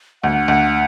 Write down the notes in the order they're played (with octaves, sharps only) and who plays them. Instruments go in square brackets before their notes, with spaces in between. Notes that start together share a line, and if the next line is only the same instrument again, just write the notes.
[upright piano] D2 [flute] F#5
[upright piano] D2